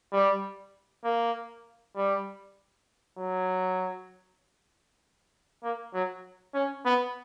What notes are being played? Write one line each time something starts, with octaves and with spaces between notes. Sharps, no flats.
G3
A#3
G3
F#3
A#3
F#3
C#4
B3